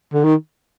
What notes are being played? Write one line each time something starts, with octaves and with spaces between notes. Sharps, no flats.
D3
D#3